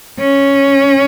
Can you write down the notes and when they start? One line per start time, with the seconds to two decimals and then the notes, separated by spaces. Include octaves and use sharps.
0.19 C#4